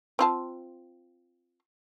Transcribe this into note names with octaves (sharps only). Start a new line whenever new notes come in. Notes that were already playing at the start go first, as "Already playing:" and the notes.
C4 F4 A5